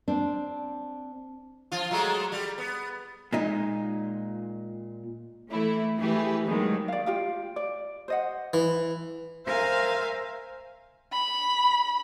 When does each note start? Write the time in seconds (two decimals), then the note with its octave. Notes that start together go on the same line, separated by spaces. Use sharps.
0.08 C4 D4
1.72 F3 F4
1.91 F#3 G#3 A3
2.32 G3
2.58 B3
3.32 A#2 G#3 D#4
5.49 E3 A3 E4
5.97 E3 A3 E4 G4 G#4 B4
6.43 D#2 G#2 D#3 F#3 G#3
6.88 D5 F5
7.06 F4 G4 F5
7.56 D5
8.08 C5 D#5 F#5
8.54 E3
9.47 A#4 C5 E5 F5 G#5
11.13 B5